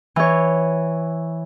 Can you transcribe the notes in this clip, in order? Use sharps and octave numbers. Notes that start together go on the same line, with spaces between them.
E3 C#5